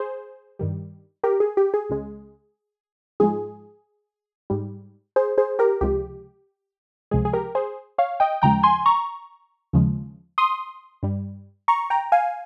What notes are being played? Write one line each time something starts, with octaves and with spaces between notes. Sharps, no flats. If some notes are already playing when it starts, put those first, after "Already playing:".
Already playing: G#4 C5
G2 D#3 G3
G4 A#4
G#4
G4
G#4
C#2 C#3 G#3
G#2 F3 G#3 G#4
G#2 G3
G#4 C5
G#4 C5
G4 A#4
C#2 C3 F3 G#3 G4
C#2 C3 F3 G#3 G#4
G#4
G4 A#4
G#4 C5
C#5 F5
D#5 G5
D#2 C#3 F3 G#3 G5 A#5
G#5 C6
A#5 C#6
D#2 C#3 F3 G#3
C6 D#6
G2 G3
A#5 C#6
G5 A#5
F5 G#5